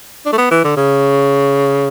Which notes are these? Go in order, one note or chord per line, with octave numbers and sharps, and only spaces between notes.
D4
A3
B3
E3
D3
C#3